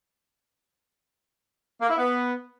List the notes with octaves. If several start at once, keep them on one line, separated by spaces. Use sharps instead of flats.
A#3
E4
B3